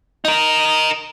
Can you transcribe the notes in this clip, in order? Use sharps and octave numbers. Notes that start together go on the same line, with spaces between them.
D#4 A#4